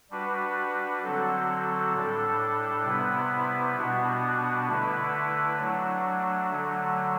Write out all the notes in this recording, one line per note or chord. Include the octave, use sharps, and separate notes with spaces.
G3 D4 F#4 B4
D3 F#3 C4 F#4 A4
A2 G3 D4 A4
C3 G3 B3 E4 B4
B2 G3 B3 D4 F#4
D3 A3 E4 B4
F#3 A3 D4
D3 F#3 A3